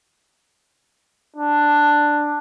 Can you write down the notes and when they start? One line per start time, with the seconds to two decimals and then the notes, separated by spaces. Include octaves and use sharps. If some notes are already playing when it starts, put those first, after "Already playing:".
1.36 D4